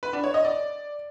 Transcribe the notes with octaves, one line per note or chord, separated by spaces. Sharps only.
B4
D4
C#5
D#5
D5